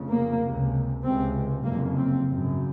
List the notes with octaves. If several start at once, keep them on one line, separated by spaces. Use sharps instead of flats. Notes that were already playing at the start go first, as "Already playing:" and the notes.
Already playing: F1 F2 C#3
A#3
C#2 C3
C#2 C3 C4
F#1 F2 C3 A#3
C4
G#1 F#2 C#3